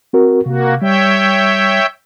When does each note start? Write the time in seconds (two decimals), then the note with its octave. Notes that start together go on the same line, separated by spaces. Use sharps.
0.13 C4 F#4 A#4
0.46 C3 A#3 F#4
0.82 G3 C#5 E5 G5